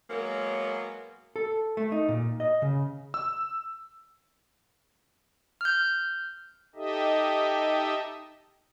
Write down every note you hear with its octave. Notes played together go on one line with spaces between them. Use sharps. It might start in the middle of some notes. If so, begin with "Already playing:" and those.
F#3 G#3 A#3 B3 A#4 C#5
A4
A3
D#4
A#2
D#5
C#3
E6
F6 G6
D#4 G4 A4 D#5 E5